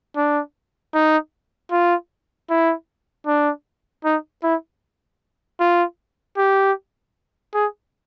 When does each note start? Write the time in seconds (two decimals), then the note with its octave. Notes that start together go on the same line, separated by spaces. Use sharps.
0.17 D4
0.94 D#4
1.72 F4
2.50 E4
3.27 D4
4.05 D#4
4.43 E4
5.60 F4
6.37 G4
7.54 G#4